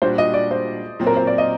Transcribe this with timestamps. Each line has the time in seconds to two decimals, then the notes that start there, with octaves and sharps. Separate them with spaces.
0.02 A#2 G3 D4 F#4 C5
0.18 D#5
0.34 D5
0.51 C5
0.99 A#2 F#3 C4
1.07 A#4
1.17 C5
1.27 D5
1.38 D#5